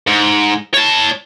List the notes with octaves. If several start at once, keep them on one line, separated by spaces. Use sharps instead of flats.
G#2
C#5 A5